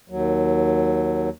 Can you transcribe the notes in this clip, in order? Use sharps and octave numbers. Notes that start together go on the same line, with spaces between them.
D#2 F#3